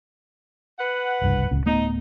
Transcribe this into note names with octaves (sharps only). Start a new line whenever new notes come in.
B4 F#5
F#1 C2 G2
D1 C#2 C#3
D1 A3 B3 D#4